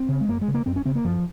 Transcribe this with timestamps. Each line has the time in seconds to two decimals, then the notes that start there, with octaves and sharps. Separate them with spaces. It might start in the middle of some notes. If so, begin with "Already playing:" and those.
Already playing: C4
0.09 C#3
0.21 G#3
0.28 F#2 A#3
0.41 G#3
0.48 C#3
0.54 A#3
0.66 F#2 C4
0.76 C#4
0.85 C#3 C4
0.95 A#3
1.05 F#2 F3